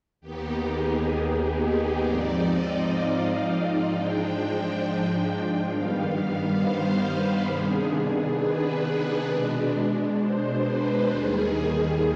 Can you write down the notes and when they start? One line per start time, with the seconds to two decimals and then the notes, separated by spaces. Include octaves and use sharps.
0.21 D#2 D#3 B3 D#4 G4
0.66 G#4
2.02 G#2 F3 C4 D#4 D5
2.47 D#5
2.93 F5
3.84 G#2 F3 G#3 D4 G5
5.65 G2 D#3 G3 B3 F5
6.56 C5
7.01 B4
7.46 C3 D#3 B3 D4 G#4
7.92 G#4
8.38 B4
9.27 B2 G#3 D4
10.18 C5
10.63 B4
11.09 D#2 D#3 G3 G#4